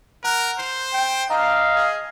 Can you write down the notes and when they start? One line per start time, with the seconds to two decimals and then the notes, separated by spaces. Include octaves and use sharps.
0.24 A#4 F#5 A#5 F#6
0.59 C5 C7
0.93 G5
1.30 D4 D#5 F5 A#5
1.76 G#4